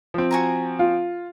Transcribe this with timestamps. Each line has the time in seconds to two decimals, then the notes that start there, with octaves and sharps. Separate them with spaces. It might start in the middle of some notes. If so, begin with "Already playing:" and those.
0.14 F3 C4
0.31 F#4 G#5 A#5
0.79 F4